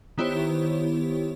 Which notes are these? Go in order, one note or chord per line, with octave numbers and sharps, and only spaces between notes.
D#3 B3 E4 G4 C5 C#5